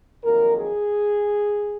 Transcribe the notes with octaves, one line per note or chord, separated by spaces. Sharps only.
F2 D#3 F#3 A#3 A#4
G#4